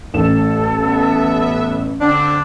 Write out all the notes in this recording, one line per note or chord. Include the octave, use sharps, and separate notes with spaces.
A1 A2 A4 E7
B3 B4 E5
D3 C4 D4